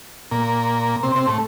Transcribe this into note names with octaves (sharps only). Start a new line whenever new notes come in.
A#2 A#3
C3 C4
C3 C4
A2 A3